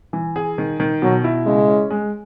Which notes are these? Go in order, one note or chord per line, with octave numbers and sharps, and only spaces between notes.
E3
G#4
D#3
D#3
B2 F#3
E4
C#3 G#3
C#4
G#3